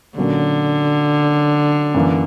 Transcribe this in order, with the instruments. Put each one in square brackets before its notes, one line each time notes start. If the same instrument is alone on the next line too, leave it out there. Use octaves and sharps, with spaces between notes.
[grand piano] A#2 F#3 A#3 C#4 [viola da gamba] D3
[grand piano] F#2 E3 A#3